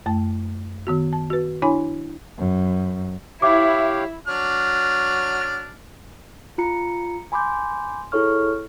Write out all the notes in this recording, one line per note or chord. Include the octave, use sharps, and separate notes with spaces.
F#2 A3 A5
D#3 B3 F#4
A5
F#4 B4
D4 E4 C#5 G#5 B5
F#2
E4 G4 C#5 E5 F5 D6
F#3 D4 F6
F4 A#5 C#7
G#5 B5 C6 D6 G6
E4 G#4 A4 C#5 C#6 F6